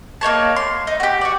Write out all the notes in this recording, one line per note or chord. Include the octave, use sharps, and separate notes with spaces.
A#3 D#4 C#5 A5
C6
D#4
F#4 G4
F#4 D5